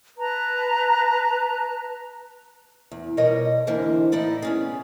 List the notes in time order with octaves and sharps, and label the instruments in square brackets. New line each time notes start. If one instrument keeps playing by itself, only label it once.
[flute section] B4 A5 A#5
[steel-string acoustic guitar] E2
B2 F3 G3 A#4 C#5 D#5
E2 G#2 D3 E3 A#3 C5
A2 D#4 E4 D5 D#5
B3 C#4 G#4